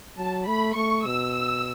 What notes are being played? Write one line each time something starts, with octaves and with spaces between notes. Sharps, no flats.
F#3 A5
A3 B5
A3 C#6
B2 E6